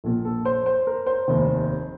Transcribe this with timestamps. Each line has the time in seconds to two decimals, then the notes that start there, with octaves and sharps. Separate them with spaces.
0.04 A#1 A#2 F3 A4
0.25 A4
0.45 C5
0.66 C5
0.87 A#4
1.06 C5
1.28 F1 D#2 D#3